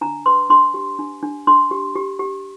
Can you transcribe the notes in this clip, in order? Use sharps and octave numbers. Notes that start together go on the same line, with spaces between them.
D4 A#5
B4 C6
D4 C6
G4
D4
D4
D4 C6
G4
G4
G4